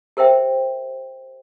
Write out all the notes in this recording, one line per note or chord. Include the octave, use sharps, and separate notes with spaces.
G4 A#4 C5 E5 G5